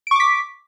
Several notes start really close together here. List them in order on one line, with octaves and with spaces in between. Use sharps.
D7 C#6 D6 B6